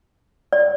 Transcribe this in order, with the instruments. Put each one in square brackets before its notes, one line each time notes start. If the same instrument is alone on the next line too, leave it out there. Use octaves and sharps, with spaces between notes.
[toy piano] D5